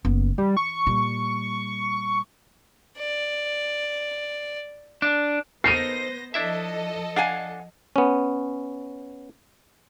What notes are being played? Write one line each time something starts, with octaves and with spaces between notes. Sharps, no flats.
F#1 B3
E3 G3
C#6
A#2 G3
D5
D4
B3 D#4 A4 A#4 C5 A#6 C7 D#7
F3 D4 E4 A4 D#5 E5
D4 F5 F#5 G#5
B3 C#4